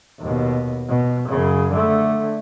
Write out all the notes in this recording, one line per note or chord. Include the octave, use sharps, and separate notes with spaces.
D#2 B2
B2
F#2 C#3
D3 A3